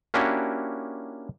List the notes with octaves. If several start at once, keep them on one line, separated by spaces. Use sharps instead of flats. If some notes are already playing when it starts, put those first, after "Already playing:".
A#3 C#4 D4 E4 F#4 G4